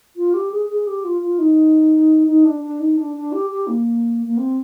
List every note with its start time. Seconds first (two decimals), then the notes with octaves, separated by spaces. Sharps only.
0.16 F4
0.33 G4
0.51 G#4
0.69 G#4
0.86 G4
1.04 F4
1.21 F4
1.38 D#4
2.26 D#4
2.44 D4
2.61 D4
2.79 D#4
2.96 D4
3.15 D4
3.32 G4
3.49 G4
3.67 A#3
4.26 A#3
4.37 C4